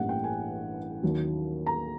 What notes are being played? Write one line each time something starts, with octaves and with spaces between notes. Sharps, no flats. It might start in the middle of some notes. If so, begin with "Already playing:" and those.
Already playing: A1 G2 E3 G3 A#3 F#5
G5
G#5
D#2 D#3 F#3
A#5